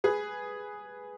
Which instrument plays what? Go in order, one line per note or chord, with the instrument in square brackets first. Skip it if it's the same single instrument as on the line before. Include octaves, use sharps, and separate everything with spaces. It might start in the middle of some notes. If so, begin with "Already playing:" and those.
[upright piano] G#4 B4